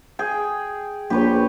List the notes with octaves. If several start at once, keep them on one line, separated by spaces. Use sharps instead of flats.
G#4 G5
A#1 G4 B4 C#5